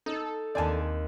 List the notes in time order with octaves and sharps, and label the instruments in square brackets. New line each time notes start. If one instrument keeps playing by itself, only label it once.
[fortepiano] D#4 [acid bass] A4
[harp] D#2 C4 [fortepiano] D5 G#5 A5